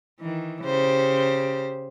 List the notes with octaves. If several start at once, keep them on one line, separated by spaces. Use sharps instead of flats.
D#3 E3
C#3 G4 C5